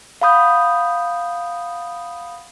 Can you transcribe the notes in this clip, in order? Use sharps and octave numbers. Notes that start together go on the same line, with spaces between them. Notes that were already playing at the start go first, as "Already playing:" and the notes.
F5 F#5 B5 D#6 G6